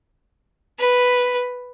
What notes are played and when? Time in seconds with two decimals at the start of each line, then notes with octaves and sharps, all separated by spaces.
0.79 B4